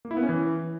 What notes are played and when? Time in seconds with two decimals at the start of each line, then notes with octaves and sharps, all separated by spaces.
0.05 A#3
0.11 E4
0.17 B3
0.23 C#4
0.29 E3